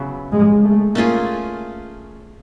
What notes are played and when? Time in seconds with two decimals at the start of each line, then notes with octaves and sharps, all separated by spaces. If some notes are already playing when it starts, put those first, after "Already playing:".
Already playing: C#3 F#3 B3 E4
0.32 G#3
0.64 A3
0.95 A3 A#3 C#4 F4 G#4